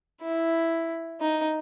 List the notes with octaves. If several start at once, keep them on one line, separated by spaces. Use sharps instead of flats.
E4
D#4